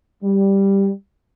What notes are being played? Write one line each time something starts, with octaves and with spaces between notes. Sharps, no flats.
G3